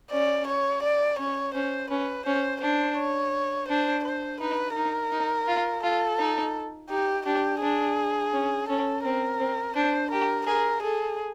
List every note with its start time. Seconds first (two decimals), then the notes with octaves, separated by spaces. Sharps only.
0.11 C#4 D5
0.48 C#5
0.83 D5
1.19 C#4 C#5
1.55 C#4 C5
1.90 C#4 B4
2.26 C#4 C5
2.62 D4 C5
2.98 C#5
3.69 D4 C5
4.04 C5
4.41 D#4 B4
4.76 D#4 A#4
5.12 D#4
5.48 F4
5.83 F4 A4
6.19 D#4
6.90 D#4 G4
7.26 D4 G4
7.62 D4 G#4
8.33 C#4
8.69 C#4 A4
9.04 C4 A#4
9.40 C4
9.76 D4 C5
10.11 G4 A#4
10.47 G#4 A#4
10.83 G#4 A4